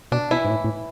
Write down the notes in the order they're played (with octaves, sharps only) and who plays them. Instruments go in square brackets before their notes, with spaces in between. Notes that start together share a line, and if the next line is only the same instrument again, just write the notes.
[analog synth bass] B2 [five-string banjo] D4
[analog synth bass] B2 [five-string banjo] E3 E4
[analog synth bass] G#2
A2
A2